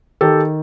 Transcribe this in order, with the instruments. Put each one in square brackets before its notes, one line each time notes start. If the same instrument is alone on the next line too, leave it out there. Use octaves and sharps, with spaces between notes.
[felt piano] D#3 G4 A4